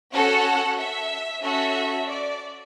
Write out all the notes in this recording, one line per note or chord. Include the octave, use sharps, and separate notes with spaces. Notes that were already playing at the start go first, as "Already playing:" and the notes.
C#4 F#4 A4 F#5
E5
C#4 F#4 A4 E5
D5